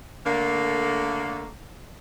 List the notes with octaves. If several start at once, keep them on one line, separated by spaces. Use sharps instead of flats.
D3 A3 A#3